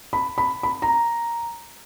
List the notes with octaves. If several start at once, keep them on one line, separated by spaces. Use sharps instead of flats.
B5
B5
B5
A#5